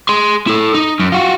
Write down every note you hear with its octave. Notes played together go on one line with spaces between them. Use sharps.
G#4 C6
E4 A4
D#4
F#2
F4 F#4